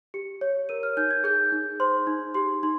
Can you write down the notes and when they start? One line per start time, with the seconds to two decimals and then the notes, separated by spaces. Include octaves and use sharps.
0.14 G4 C#7
0.41 C#5
0.69 A#4 D#7
0.83 F6
0.97 D#4 G6
1.11 G#6
1.24 G#4 G6
1.52 D#4
1.80 C5 C6
2.07 D#4
2.35 G4 C6
2.63 D#4 C6